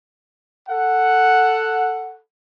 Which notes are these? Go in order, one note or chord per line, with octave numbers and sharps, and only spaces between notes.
A4 F#5